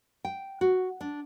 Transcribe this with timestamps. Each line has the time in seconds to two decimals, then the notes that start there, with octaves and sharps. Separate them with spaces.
0.25 G5
0.61 F#4
1.01 D4